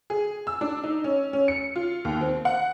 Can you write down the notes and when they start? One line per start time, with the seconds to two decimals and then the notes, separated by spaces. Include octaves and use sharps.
0.10 G#4
0.47 E6
0.61 D4
0.84 D#4
1.04 C#4
1.33 C#4
1.48 C#7
1.76 F4
2.05 D#2
2.21 C4
2.45 F#5